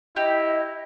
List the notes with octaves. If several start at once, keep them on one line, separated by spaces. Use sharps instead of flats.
E4 G4 D#5